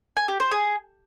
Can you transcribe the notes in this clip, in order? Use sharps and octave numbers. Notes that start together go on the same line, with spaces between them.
G#5
G4
C5
G#4